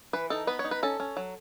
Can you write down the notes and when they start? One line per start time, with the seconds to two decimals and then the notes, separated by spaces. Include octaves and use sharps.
0.13 E3 B4
0.30 D#4 A4
0.47 B3 B4
0.59 C#5
0.64 D#4
0.71 B4
0.83 C#4 A4
1.00 C#4
1.17 F#3